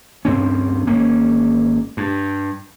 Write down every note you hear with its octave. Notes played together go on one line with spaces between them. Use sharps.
D2 G2 C4 C#4
G#1 A#3 C#4
G2